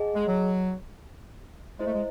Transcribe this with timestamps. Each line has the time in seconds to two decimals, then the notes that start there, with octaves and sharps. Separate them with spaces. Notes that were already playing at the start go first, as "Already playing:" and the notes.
Already playing: G#4 D#5 F#5 A5
0.15 G#3
0.26 F#3
1.79 G#3 E4 C5 D#5
1.86 A3
1.93 G#3